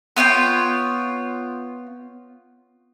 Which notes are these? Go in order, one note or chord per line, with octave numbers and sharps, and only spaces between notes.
B3 F4 C#5 G5